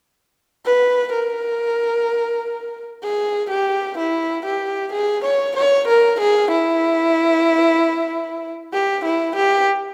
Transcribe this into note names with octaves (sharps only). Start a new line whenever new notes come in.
B4
A#4
G#4
G4
E4
G4
G#4
C#5
C#5
A#4
G#4
E4
G4
E4
G4